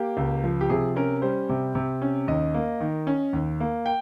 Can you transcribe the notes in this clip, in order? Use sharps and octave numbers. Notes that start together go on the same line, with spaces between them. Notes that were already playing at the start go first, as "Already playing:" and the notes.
Already playing: A#3 G4
C#2
F3
G4
C3 G#4
C#4 A#4
G3 C5
C3
C3
C#4
D#2 D#5
A#3
D#3
C#4
D#2
A#3
G5